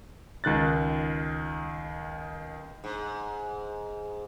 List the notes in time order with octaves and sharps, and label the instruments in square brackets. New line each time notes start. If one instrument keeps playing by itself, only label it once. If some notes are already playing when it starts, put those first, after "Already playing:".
[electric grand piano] C#2 D#3 F#6 A6
[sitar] G#2